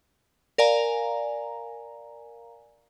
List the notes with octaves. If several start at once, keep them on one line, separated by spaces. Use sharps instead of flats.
A#4 D5 F5 G#5 A#5